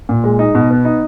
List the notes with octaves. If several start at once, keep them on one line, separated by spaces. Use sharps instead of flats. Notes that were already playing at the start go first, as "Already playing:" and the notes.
A#2
G#3
D#4
B2
B3
D#4